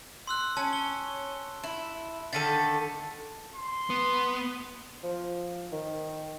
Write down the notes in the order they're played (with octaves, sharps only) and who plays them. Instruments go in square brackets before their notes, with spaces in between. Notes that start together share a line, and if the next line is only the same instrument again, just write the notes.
[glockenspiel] C6 E6 F#6
[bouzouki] C#4 [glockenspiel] A5
[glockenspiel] G7
[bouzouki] E4
[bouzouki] D3 D#3 A4 [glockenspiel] A6 B6 D#7
[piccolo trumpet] C6
[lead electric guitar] B3
[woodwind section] F3
D#3